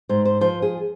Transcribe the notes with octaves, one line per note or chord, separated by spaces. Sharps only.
G#2 C5
C5
F3 C5
G#4